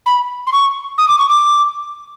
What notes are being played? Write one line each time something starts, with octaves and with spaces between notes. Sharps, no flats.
B5
C6
C#6
D#6
D6
C#6
D6